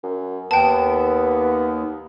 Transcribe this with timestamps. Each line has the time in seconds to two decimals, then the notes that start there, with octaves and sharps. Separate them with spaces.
0.03 F#2
0.51 D#2 B3 G5 A5